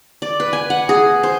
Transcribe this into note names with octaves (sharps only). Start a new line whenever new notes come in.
D5
B4
G#5
F#5
G#4
C5